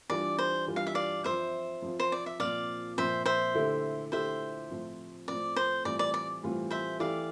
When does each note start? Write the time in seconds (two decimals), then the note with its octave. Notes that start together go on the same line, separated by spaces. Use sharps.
0.10 E3 G3 D4 F4 D5
0.38 C5
0.67 E3 G3 D4 F4
0.76 F5
0.87 E5
0.95 D5 F5
1.24 F3 C4 F4 C5 E5
1.82 F3 C4 F4
2.00 C5
2.12 D5
2.26 E5
2.39 A#2 F3 C4 D5 F5
2.97 A#2 F3 C4 C5 E5
3.26 C5 E5
3.55 D3 A3 E4 G4
4.12 D3 A3 E4 G4 C5 E5
4.70 A2 F3 C4
5.28 A2 F3 C4 D5
5.56 C5
5.85 A2 E3 G3 C4 F4 D5
5.99 D5
6.14 D5
6.43 A2 E3 G3 C4 F4
6.71 C5 E5
7.00 E3 A3 E4 G4 D5 F5